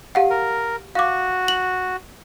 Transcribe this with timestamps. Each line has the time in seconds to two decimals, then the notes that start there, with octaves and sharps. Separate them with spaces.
0.15 G4 F5 F#5
0.30 A#4
0.95 F#4 F5 D6
1.48 F#7